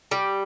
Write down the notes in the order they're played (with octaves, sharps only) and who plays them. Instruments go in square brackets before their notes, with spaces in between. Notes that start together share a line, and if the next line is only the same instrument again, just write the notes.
[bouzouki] G3